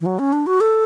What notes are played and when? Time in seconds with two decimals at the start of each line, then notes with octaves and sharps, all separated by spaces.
0.01 E3
0.06 F#3
0.19 C#4
0.33 D4
0.47 F#4
0.61 A4